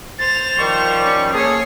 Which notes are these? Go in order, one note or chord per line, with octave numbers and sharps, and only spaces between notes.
C5 A6 F7
D#3 F3 G3 C#6
C#4 C#6
A#3 G#4 A4 C#5 D#6 C7